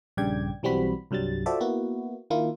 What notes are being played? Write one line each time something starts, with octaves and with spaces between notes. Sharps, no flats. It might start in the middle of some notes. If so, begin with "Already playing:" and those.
A#1 G2 C#3 D5 G5 G#6
B1 E3 G3 C4 F#4 B5
C2 G2 F#3 G3 A6
F4 F#4 A4 C5 D5 E5
A#3 B3 E4 F#4
D#3 A#3 E4 F4